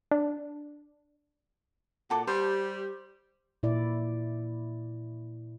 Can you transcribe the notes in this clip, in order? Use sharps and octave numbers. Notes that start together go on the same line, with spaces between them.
D4
A#2 F#4 A4 D6
G3 G4 C5
A#2 E4 D5